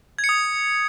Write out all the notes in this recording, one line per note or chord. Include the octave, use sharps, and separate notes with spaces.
G#6
C#7
D#6